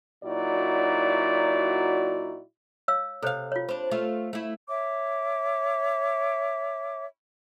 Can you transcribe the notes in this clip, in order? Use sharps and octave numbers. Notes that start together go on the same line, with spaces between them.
A#2 F#3 D#4 E4 F#4 D5
C#5 F5 E6
C3 A4 C5 C#5 F5
F4 C#5
D4 C5 B5
A3 F4
A3 E4
C#5 E5 D6